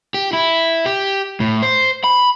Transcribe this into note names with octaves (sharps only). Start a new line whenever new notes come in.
G4
E4
G4
A2
C5
B5